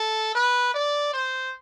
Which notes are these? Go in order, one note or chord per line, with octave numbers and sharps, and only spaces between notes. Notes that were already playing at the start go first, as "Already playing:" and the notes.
Already playing: A4
B4
D5
C5